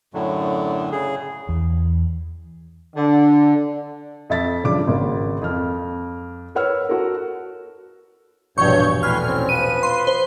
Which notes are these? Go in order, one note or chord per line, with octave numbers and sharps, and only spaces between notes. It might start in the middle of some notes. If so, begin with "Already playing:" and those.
F#2 A2 D3 F#3
C#3 G#4
E2
D3
F2 E5 A6 B6
G2 C#3 F3 D6
G#1 C#3 A#3
F2 F6
A#4 B4 C#5 F#5 E6 F6
F#4 A4 A#4
E1 A#1 G2 C#5 C#6 G6
A2 B4 G#5 C6 F6
C4 C#4
F3 B4 D#7
C6
C5